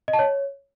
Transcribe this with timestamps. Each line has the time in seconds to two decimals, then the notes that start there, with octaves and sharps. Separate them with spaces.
0.08 D#5
0.13 A5
0.19 C#5